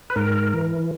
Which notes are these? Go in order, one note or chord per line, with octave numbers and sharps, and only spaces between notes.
B4
G#2 A#4
E3